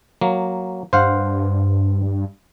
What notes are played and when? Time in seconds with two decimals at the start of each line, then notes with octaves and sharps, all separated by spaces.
0.21 F#3 A#3
0.93 G2 C5 F5 F#5